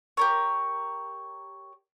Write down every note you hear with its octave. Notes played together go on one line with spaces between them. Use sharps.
G4 A#4 C#5